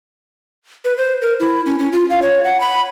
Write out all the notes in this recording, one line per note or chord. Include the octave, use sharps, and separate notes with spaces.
B4
C5
A#4
E4
C#4
C#4
F4
F5
C#5
F#5
B5